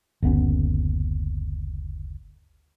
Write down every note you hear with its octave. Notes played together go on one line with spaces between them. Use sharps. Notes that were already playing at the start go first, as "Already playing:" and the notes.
F#1 D2 B3 C#4